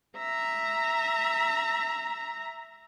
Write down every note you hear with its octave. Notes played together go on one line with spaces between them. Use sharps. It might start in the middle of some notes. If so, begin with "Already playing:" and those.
E5 A#5